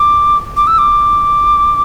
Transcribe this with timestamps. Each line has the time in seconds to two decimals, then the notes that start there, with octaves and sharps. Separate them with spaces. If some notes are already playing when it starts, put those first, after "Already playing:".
Already playing: D6
0.57 D6
0.67 E6
0.78 D6